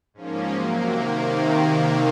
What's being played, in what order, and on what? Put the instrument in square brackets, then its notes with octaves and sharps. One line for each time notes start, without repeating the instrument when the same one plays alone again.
[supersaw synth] G#2 F3 A#3 C#4
C3 F#3 A#3
C3 D#3 A#3